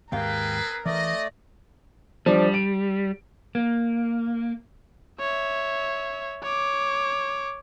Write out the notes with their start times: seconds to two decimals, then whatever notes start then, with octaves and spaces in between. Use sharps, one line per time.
0.12 D#2 G#2 C4 G#4 A#4 B4 F5 G5
0.86 E3 A3 D5 D#5
2.26 F3 G3 D4
2.54 D7
3.55 A#3
5.20 C#5 E5
6.43 C#5 D6